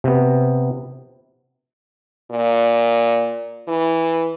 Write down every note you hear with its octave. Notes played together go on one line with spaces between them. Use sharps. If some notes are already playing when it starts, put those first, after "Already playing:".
C3 B3
A#2
E3